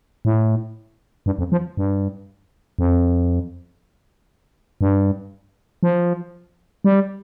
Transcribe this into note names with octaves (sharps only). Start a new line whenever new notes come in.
A2
G2
F2
F3
G2
F2
G2
F3
G3